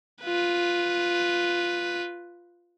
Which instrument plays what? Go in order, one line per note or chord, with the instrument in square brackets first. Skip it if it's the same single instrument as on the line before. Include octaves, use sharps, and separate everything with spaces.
[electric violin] F4 B4